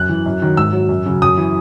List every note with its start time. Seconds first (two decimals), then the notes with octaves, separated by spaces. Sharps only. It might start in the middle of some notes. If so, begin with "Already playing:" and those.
Already playing: F#2 F#6
0.09 E3
0.26 F#2
0.42 D#3 F#3
0.57 G#2 E6
0.73 F#3
0.89 F#2
1.06 C#3 F#3
1.22 F#2 D#6
1.38 E3